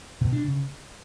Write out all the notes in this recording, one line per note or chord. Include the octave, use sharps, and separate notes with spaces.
B2
D4
C#3